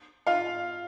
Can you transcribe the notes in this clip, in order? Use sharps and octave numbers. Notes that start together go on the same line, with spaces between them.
F4 F5